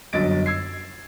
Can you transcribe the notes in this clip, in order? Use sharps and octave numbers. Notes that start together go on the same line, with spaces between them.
G1 F#2 F#3 D#5 A6 D7
E6 G#6 C7